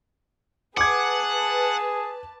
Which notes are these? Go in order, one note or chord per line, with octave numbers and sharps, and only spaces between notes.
G#4 B4 F#5 A5 D6 G#6